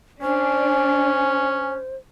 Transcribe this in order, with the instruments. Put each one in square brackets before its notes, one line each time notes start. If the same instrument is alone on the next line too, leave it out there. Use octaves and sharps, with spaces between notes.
[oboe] C#4 [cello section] D4 [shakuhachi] C5 [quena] G#5